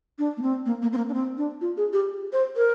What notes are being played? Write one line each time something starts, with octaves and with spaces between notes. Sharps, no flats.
D4
A#3
C4
A#3
A#3
C4
A#3
D4
C4
D4
F4
G#4
G4
C5
A#4